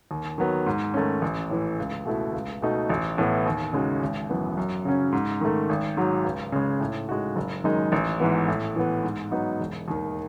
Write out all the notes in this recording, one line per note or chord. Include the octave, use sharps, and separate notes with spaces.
D#2
D#3 F#3 B3
G#2
D#3 A3 C#4
A1
A2 E3
C#2
B2 A3 E4
C#2
B2 A3 D#4
A1
A2 E3 B3
D#2
C#3 G#3 D#4 F#4
G#1
F#2 E3 B3
F#2
C#3 F#3 C#4
G#2
D#3 A3
G#1
G#2 F#3
C#2
C#3 G#3
A2
G#3 D#4 F#4
F#1
F#2 D#3 G#3 D#4
A1
G#2 E3 B3
A2
E3 B3
G#2
F#3 B3 D#4
E1
D#2 D#3